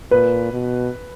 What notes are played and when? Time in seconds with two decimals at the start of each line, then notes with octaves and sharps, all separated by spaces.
0.11 A#2 B4
0.53 B2